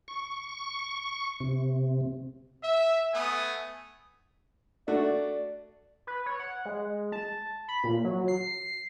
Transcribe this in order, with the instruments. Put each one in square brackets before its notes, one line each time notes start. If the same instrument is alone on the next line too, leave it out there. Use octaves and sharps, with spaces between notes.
[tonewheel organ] C#6
C3
[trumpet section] E5
A3 B3 G#5 D#6
[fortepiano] A3 D4 F#4 [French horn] D5
[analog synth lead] B4
C#5
F#5
G#3
A5
B5
A#2
F#3
C7